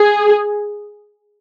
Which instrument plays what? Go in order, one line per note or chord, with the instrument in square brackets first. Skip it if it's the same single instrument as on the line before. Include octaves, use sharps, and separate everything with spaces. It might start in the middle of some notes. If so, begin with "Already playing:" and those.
Already playing: [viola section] G#4